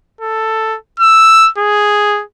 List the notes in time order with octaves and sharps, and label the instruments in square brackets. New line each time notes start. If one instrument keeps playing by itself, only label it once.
[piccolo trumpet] A4
E6
G#4